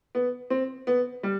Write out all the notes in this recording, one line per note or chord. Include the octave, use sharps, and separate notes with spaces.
B3
C4
B3
G3